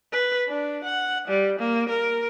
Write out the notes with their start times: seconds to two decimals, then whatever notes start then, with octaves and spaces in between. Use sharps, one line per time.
0.12 B4
0.48 D4
0.84 F#5
1.28 G3
1.59 A#3
1.89 A#4